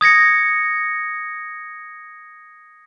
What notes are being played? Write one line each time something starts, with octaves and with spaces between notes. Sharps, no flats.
D#6 G#6 A#6 C#7